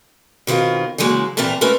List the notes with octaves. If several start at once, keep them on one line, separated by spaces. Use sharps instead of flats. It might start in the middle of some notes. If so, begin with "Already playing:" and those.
B2 D#3 C4 F4 A#4
C#3 E3 F#3 G#3 A#3
A#2 E3 C4 A#4 E5 A5
G#3 A3 C#4 A#4 B4